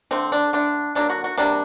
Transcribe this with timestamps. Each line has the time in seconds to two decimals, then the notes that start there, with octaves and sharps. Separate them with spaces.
0.11 D3 A3 C4
0.32 D4
0.53 D3 A3 D4
0.95 D3 F#3 A#3 D4
1.10 F#4
1.24 F#4
1.38 C3 G3 A#3 D4